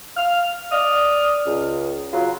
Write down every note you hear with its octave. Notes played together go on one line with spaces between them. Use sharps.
F5 F6
D5 D#6 F6
C#2
C#3 F#3 F4